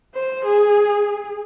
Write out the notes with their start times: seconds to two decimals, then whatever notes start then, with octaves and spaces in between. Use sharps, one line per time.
0.15 C5
0.45 G#4